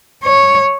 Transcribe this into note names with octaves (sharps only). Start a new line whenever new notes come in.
C#5